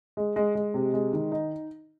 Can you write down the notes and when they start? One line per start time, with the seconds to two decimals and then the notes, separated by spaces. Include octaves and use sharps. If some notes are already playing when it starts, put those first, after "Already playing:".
0.17 G#3
0.36 G#3
0.55 G#3
0.74 C3
0.94 G#3
1.13 D#3
1.32 D#4